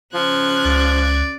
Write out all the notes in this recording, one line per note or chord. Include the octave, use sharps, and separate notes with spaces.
C#3 F3 F#6 G#6
C#2 D5